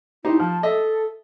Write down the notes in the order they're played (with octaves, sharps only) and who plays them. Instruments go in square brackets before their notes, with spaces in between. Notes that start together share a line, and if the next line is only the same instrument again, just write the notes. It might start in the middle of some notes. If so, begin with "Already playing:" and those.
[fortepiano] D#4 G4 C5 [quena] E4
[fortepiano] F3 [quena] A5
[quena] A4 [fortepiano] D#5 E5